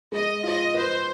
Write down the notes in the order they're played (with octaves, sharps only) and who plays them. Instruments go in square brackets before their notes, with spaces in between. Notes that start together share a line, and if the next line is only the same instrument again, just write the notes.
[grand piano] G#3 [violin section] D#5
[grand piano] F4 [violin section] D#5
[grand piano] B4 [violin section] C5